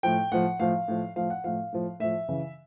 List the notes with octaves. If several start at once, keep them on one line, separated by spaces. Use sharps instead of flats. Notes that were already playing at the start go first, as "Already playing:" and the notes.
A2 F3 G5
A2 F3 F#5
A2 F3 F5
A2 F3
A2 F3 F5
F#5
A2 F3 F5
A2 F3
A2 F3 E5
C#3 E3